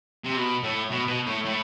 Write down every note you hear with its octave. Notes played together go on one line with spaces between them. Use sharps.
C3
B2
A2
B2
B2
A2
A2